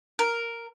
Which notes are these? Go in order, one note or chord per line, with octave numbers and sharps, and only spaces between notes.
A#4